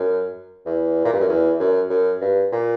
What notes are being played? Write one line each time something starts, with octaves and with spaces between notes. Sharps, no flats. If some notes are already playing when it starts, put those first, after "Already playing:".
Already playing: F#2
E2
A#2
G2
F#2
E2
F#2
F#2
G2
A#2